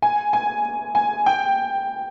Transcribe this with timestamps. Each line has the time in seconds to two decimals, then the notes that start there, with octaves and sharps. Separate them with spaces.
0.02 G#5
0.33 G#5
0.95 G#5
1.26 G5